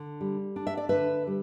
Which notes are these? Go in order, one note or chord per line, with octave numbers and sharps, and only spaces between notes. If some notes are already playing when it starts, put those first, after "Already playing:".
Already playing: D3
G3
D4
E5
D5
D3 B4 E5
G3